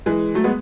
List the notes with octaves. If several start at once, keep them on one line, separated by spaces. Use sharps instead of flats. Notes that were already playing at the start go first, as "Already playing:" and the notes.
E3 G#3
F#3 A3
G#3 B3